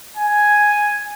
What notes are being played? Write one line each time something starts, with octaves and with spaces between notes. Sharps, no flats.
G#5